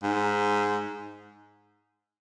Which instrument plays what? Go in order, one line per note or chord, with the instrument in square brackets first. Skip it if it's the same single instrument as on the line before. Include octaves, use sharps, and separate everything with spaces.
[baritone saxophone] G#2